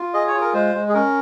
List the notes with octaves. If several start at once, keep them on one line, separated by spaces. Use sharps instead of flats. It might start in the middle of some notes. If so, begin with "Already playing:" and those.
Already playing: F4
G#4 D#5
C#5
F4
A#4
G#3 C5
G#3
G#4
C#4 A#4